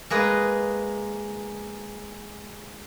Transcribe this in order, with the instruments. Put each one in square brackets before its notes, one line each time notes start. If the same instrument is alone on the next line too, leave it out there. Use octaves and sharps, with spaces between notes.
[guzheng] G#3 A#3 G#4 B4 D#5